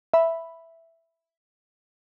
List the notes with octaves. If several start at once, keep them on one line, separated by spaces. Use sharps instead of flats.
E5 B5